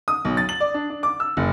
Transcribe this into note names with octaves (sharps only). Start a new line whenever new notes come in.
D#6
B1
A6
F#7
D5
D4
D4
D6
E6
F#1